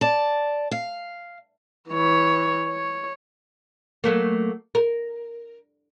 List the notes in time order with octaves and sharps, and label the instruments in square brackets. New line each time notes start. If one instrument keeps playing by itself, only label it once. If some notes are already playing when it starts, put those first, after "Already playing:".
[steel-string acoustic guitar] D5 A5
F5
[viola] E3 C#5
C#5
[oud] F#3 A3 A#3
A#4